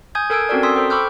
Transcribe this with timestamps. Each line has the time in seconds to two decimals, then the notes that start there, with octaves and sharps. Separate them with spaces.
0.15 G#5 D#6 G6 G#6
0.30 A4 A#4 G#5 E6 G#6 D7
0.49 C4 C#4 F#4 A4 A#4 D5
0.63 C6 D#6 E6 B6
0.76 A4 C5 G5
0.90 B5 C#6 D6 E6 F6 G6